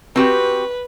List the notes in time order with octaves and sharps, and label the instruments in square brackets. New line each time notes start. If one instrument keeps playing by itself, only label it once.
[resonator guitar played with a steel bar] C4 F#4 G4 [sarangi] B4